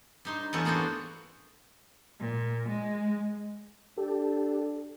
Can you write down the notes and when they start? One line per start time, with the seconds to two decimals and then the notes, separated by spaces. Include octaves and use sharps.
0.25 G2 D#4 C6
0.53 E2 B3 C#4 A4
0.65 A#3 B3 D4 F#4 C5
2.20 A#2
2.69 G#3
3.97 D4 G4 A4